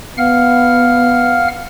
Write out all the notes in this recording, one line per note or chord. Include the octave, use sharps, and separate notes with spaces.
B3 F5 F#5 F6